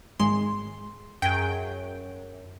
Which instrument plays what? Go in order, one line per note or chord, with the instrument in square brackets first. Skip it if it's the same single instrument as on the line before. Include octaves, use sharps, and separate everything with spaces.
[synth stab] G#1 G#3 C6
[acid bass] F#2 [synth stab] G#4 G5